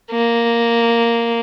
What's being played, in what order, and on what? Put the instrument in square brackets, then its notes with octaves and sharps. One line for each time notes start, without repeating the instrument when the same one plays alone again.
[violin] A#3